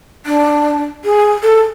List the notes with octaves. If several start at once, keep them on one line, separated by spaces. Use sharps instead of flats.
D4
G#4
A4